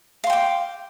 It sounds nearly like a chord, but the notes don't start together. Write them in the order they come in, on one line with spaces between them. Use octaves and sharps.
F5 C6 G5 D6